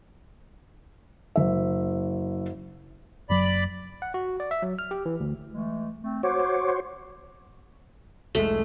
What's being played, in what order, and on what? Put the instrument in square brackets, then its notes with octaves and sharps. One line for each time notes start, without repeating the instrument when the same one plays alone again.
[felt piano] F#1 E5
[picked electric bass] F#1 F#3 [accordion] D5 B5
[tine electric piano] F#5
F#4
D5
E5
F#3
F6
G4
E3
D2
[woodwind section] E3 G#3 A3
A3 C4
[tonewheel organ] F#4 C5 C#5 [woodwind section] F#5 D6
[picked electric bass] E1 B1 G#3 [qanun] A3